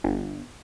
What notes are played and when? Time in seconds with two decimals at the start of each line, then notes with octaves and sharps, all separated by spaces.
0.04 G1